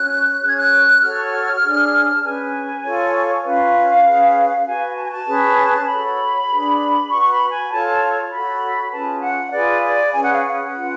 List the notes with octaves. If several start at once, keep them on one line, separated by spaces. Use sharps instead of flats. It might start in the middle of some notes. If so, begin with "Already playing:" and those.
Already playing: C#4 F#4 C#5 F#6
C#4 G#4 C#5 F#6
G#6
F#6
F#4 A4 C#5 F6
D4 G#4 C#5
A5
C#4 G#4 B4 G#5
F4 A4 C#5
C#4 F4 B4 F5
C#4 G#4 B4
F#4 B4 G#5
A5
G#5
A5
C#4 G#4 B4
F#4 A4 C#5 B5
D4 G#4 B4
F#4 B4 C#6
C#6
B5
G#5
F4 A4 C#5 A5
F#4 A4 C#5 B5
G#5
C#4 F4 G#4 B4 A5
F#5
F4 G#4 B4 D5
D5
C#4 G#4 B4 G#5
F#5
F5
F#5
C#4 F4 B4